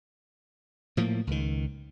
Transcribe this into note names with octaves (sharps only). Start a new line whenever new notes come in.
A2 F3 A#3
C#2 D#3